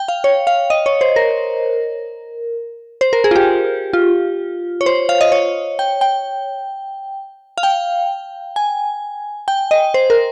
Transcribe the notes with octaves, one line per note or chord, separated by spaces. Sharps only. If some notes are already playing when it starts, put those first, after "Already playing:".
Already playing: G5
F5
C#5
F5
D#5
C#5
C5
A#4
C5
A#4
G#4
F4
G4
F4
C#5
C5
F5
D#5
C#5
G5
G5
F5
G5
G#5
G5
D#5
C5
A#4